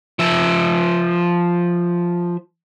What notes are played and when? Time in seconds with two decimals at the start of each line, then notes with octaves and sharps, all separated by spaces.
0.19 F3 E5